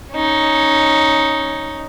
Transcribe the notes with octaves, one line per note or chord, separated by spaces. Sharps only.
C#4 D#4